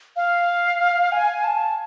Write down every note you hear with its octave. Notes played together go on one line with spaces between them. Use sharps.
F5
G#5
A5